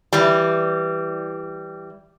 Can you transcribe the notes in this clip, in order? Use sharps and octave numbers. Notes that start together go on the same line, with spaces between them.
E3 G3